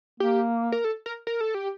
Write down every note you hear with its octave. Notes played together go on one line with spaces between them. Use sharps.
A#3 G4
A#4
A4
A#4
A#4
A4
G4